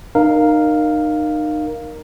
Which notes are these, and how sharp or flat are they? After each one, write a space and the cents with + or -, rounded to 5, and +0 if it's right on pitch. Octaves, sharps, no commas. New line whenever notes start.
D#4 -30 A#4 +0 F5 +0